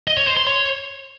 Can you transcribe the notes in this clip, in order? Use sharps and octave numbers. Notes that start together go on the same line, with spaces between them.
D#5
C#5
C5
C6
C#5